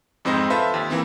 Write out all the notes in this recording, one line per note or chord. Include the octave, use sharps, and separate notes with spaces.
F2 G#2 C4 D#4 C5 D#5
F4 A4 B4 C5 E5
D#2
E3 A#3 C4